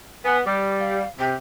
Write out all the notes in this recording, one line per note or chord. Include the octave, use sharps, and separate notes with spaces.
B3 G#5
G3 D6
F5
C3 G4